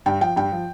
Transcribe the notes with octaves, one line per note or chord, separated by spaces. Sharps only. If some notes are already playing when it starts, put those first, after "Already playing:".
G2 G5
F3 G5
G2 G5
F3